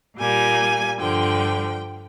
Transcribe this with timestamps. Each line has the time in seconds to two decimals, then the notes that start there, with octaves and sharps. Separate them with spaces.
0.17 A#2 G3 A#3 G#5
0.99 G2 D3 F3 G5